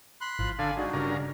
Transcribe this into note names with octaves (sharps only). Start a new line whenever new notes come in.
B5 C6 F#6
G#1 F3
D3 D4 A4 F5 G#5
G#3 D4 D#4 F#4
G2 C#3 A#4